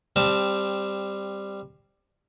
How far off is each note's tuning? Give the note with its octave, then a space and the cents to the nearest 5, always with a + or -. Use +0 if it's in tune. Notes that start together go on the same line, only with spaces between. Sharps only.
G3 +10 C4 +0 A5 -5